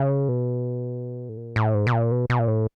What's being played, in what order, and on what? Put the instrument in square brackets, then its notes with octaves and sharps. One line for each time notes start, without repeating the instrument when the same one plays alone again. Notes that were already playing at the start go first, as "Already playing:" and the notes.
Already playing: [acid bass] C#3
B2
A2
A#2
A2
G#2
B2
A#2
B2
B2
A#2
A2